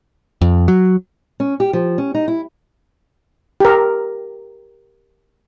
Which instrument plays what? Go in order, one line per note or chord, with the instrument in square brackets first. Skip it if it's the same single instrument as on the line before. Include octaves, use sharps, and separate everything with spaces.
[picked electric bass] F2
F#3
[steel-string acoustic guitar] C#4
G4
F3
C#4
D#4
E4
[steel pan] G4 A#4